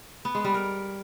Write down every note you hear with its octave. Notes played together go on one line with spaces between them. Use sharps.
B3
G#3
G3
A#4